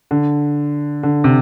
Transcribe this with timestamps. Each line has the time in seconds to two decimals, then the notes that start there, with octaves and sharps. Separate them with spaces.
0.11 D3
1.03 D3
1.24 C3